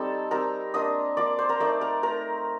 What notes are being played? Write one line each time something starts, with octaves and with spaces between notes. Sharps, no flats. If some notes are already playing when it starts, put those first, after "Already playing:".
Already playing: G3 C4 D#4 A4 A5
G3 C4 D#4 A#4 A#5
A#3 D4 F4 D#5 D#6
A#3 D4 F4 D5 D6
C5 C6
A#4 A#5
A3 D#4 D5 D6
A#4 A#5
A3 D#4 A#4 A#5